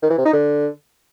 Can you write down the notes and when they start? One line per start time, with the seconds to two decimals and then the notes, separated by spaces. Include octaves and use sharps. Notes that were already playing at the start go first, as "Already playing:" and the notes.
0.02 D#3
0.10 E3
0.18 C3
0.25 D#4
0.33 D3